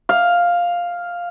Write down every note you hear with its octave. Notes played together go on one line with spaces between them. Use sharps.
F5